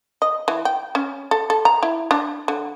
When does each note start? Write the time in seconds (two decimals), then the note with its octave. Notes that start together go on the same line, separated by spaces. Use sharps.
0.22 D#5
0.48 E3
0.65 G5
0.95 C#4
1.31 A4
1.50 A4
1.65 A#5
1.83 E4
2.11 D4
2.48 D3